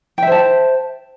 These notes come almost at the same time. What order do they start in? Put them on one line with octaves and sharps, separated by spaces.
G5 E5 C5 A5